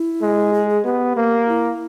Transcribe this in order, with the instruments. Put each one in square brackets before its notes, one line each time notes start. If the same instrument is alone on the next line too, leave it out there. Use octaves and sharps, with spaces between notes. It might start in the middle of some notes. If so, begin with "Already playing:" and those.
Already playing: [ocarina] E4
[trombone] G#3
[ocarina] G#4
G#4
[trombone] B3 [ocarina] G4
[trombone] A#3
[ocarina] E4